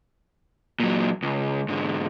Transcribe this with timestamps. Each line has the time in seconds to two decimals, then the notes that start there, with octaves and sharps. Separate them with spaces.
0.80 A#2 F#3
1.22 C#2
1.69 G#2 D3